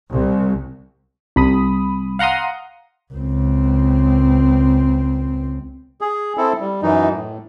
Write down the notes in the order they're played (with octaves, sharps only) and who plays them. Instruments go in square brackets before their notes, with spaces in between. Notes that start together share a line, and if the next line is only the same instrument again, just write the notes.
[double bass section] C2
[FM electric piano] C2 B5 D#6
F5 F#5 A#5 C6 D#6
[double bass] C#2 C4
[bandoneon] G#4
C4 E4 A4
G3
F#2 E3 D#4
A2